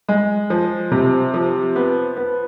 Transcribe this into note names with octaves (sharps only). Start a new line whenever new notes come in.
G#3
F3
C3
F3
B3
B3